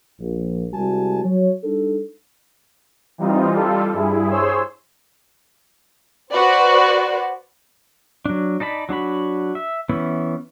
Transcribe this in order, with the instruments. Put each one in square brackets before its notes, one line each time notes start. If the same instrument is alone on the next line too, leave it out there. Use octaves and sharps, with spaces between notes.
[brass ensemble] A#1
C2 G3 G#3 F#4 G#5 A5
F#3 C#5
G3 D4 D#4 A4
[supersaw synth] E3 G3 C4 D#4 F4
G3 F4 A4
G2 E4 G#4
G#4 C5 C#5 C6 E6
[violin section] F#4 B4 C5 D5
[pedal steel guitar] F#3 D4
D#4 D5 A5 B5
F#3 D4 F#4 B5
E5
E3 B3 C#4 E4